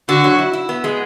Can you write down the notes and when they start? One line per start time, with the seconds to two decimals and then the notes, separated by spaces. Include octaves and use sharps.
0.09 D3 F#4
0.24 F#3
0.39 E4
0.53 E4
0.69 B3
0.84 G#3